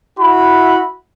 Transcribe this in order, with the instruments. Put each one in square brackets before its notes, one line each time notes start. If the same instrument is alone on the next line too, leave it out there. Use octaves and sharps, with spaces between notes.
[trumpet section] E4 F#4 B5